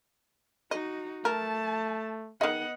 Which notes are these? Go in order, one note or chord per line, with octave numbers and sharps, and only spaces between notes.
D#4 F#4 D#5
A3 A#4 A5
D#3 B3 G#4 D#5 F#5